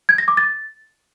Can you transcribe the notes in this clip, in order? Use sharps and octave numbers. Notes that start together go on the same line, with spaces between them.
G#6
A#6
D6
A6